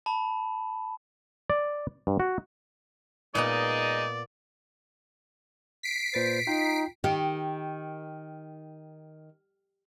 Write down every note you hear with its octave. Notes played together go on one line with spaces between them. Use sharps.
A5 B5
D5
G2
F#4
A#2 G#3 B3 D#4 D5 D#5 A#5
B6 C7 D7
A#2 B4 C5 A6
D#4 F4 G5 A#5
D#3 G4